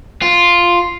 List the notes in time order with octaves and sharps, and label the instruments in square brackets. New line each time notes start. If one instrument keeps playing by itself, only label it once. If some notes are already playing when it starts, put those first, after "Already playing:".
[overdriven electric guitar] F4